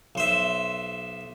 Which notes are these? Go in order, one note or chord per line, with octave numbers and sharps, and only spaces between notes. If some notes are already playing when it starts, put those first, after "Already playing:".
B1 C5 E5